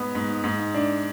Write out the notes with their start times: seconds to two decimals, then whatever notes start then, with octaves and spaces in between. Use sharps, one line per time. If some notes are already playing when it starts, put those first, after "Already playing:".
Already playing: G#2 B3
0.15 G#2
0.44 G#2
0.74 D4